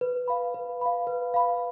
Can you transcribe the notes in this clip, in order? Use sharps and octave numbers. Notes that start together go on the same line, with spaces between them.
B4
F5 B5
B4
F5 B5
B4
F5 B5